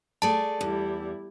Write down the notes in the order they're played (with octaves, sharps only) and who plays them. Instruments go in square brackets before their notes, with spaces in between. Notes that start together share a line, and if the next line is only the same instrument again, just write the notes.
[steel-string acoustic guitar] A3 G#4 D5 [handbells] A5
[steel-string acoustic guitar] E2 [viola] G3 E4